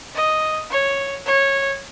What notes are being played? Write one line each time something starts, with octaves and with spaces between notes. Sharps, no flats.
D#5
C#5
C#5